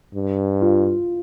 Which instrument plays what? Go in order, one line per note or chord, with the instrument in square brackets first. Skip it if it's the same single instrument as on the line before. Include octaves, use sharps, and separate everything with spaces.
[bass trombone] G2
[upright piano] F4